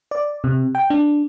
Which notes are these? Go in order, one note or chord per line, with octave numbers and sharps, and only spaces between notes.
D5
C3
G5
D4